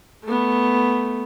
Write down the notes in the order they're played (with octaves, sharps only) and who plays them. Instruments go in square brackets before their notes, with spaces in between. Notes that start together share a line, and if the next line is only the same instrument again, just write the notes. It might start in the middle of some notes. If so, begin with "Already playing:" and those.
[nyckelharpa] A3 B3